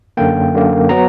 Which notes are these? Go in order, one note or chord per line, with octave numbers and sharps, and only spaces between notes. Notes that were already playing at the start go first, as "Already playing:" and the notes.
F#2 D3 A#3 G5
F#2 D3 A#3
F#3 B3 A#5